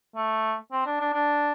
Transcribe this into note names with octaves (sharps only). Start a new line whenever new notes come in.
A3
C4
D4
D4
D4